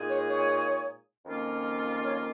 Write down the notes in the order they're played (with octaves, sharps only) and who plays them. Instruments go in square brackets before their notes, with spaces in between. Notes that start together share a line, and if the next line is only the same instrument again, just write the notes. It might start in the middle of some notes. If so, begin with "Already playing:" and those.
Already playing: [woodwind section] A#2 G#3 D#4 G#4
[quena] C#5
C#5
[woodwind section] F2 D#3 A#3 C#4 F4
[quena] C#5